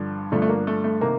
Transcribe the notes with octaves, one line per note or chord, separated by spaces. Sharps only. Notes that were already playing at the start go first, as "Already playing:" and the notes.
Already playing: G2 D3 F3
G2 D3 F3 A3
A3
A#3
A3
A3
C3 D#3 A#3